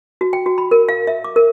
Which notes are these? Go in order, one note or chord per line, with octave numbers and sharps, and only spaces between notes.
F#4
G5
F#4
B5
A#4
F5
E5
D6
A#4